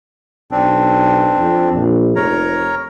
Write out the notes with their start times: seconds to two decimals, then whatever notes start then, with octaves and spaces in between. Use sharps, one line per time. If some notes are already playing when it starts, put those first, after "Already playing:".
0.51 B1 C4 D4
1.38 F2
1.75 A#1
2.16 F1 A#4 C#5 A#5